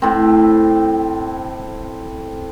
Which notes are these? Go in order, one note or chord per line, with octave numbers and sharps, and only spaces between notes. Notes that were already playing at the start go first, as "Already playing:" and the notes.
A2 C4